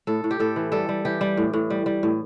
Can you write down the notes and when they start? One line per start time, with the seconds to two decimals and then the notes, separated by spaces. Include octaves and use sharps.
0.07 A2 A4
0.24 A2
0.31 G4
0.40 A2 A4
0.56 E3
0.72 G3 A4
0.89 G3
1.05 E3 G4
1.21 G3
1.37 A2
1.53 A2
1.70 G3
1.86 G3
2.03 A2